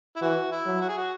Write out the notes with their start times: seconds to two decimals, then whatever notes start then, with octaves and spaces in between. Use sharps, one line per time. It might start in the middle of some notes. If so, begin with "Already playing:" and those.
0.16 E4
0.22 E3 F#4
0.52 E4
0.66 F#3
0.81 F#4
0.89 G#4
0.98 F#4